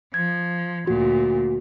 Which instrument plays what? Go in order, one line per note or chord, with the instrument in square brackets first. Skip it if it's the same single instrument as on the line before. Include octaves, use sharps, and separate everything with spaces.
[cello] F3 [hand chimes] G#6
[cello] D2 A#2 [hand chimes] F#4